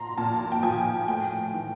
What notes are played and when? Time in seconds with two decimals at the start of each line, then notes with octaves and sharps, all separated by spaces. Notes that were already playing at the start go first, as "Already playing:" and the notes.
Already playing: A#2 F3 A#5 C6
0.18 A#2 A5
0.52 G5
0.63 F3 G#5
1.08 A2 G5
1.54 E3